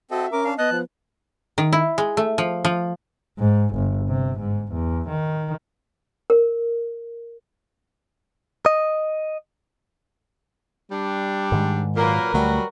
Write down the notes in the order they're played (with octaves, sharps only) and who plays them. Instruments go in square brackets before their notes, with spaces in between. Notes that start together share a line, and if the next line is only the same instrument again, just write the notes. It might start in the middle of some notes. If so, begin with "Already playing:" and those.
[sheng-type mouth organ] C4 A4 D#5 [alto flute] F#4 [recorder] E5
[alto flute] C#4 [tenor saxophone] A#4 [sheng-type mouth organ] D6
[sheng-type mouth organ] D4 F5
[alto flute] B3 [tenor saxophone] D#5 [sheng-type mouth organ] A5 [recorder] F#6
[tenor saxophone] F3
[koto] D#3
E4
G#3
A3
F3
F3
[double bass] G#2
G1
C3
G#2
E2
D#3
[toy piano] A#4
[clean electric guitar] D#5
[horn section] G3 D4
[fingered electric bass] G#2 D#3 G#3
[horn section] A#2 F#3 A#3 [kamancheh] A#4 B4
[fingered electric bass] D2 A3 [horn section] F#3 G3 F#4